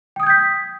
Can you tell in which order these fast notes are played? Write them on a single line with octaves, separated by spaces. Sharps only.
G5 D#6 G#6 G6 B6